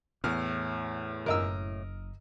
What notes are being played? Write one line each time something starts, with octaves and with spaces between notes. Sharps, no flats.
E2 A2 F6
F#1 A#4 D#5 E6